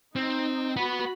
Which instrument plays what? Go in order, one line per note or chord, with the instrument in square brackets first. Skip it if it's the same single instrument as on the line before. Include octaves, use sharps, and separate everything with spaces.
[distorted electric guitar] C4 [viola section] D#4
[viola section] F#4 B5 [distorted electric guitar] B4 F#5